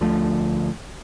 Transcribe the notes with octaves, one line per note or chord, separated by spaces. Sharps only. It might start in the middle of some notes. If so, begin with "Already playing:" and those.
D2 D3 F3 A3